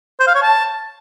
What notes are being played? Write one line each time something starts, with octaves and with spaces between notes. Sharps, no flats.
C5
F5
C#5
A5